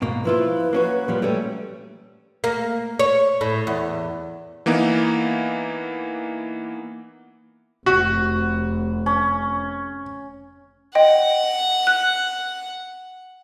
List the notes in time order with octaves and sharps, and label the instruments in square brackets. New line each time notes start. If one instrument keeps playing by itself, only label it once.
[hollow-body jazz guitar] G#2 B2 A#3
[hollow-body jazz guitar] F3 E4 F4 [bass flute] B4
[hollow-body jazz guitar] A#3 C#4 F#4
A#2 F3 G3
G3 A3 C#4
[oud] A#3
C#5
A2
E2
[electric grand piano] E3 A#3 B3 D#4
[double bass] F1 [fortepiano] F#4
[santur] C#4
[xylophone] D#5 G5 [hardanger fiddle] F#5
[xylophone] F#6